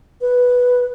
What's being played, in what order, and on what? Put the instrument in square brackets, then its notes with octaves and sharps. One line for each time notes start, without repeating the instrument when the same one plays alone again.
[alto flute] B4